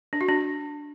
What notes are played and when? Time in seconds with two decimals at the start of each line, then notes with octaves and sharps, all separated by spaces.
0.13 D4
0.21 F#4
0.29 D4